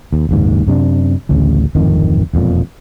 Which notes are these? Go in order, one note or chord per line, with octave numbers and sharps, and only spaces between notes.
D#2
F#1 D#2 G#2
F#2 C3 C#4 D4
A1 D2 C#3
D1 G#1 F2 D#3
E1 F2 A#2